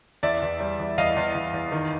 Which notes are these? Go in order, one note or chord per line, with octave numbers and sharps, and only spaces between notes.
E2 D5 E5
E2
G3
E2
E2 D#5 F5
E2
E2
E2
D#3